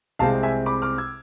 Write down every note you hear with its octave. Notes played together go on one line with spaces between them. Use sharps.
C2 C3 G#3 C4 F5 A5
E5 G#5
B5 D6
D6 F6
E6 G#6